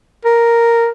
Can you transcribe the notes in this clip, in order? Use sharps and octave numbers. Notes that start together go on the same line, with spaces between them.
A#4